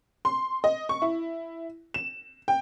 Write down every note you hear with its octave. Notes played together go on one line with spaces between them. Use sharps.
C6
D#5
C#6
E4
E7
G5